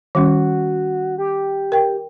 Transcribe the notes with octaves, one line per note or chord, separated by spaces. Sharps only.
D#3 G3 C#4 F#4
G4
A#4 G5